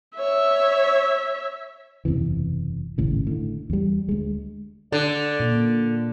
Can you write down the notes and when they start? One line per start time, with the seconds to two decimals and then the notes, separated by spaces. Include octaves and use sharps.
0.18 C#5 E5
2.05 F#1 E2 C3 E3
2.98 D#1 G#1 A2 C#3
3.27 A2 D3
3.70 E2 G3
4.09 D2 G#3
4.92 D3 A4 D5
5.40 A#2